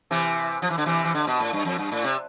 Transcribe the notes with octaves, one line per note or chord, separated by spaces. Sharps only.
C3 E3
F3
E3
D3
C3 E3
E3
D3
B2
A2
G2
F2
G2
A2
C3